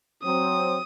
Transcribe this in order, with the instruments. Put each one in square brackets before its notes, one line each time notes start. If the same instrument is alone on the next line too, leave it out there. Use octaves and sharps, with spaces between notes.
[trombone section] F#3 C4 [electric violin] D#6